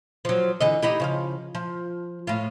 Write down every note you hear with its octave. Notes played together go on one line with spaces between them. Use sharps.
F3 F#3
D3 E3 D#5
D#4 E4 G4
C#3 F3 F5
F3
A2 F4